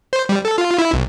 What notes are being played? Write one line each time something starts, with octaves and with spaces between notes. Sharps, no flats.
C5
G3
A4
F4
E4
B1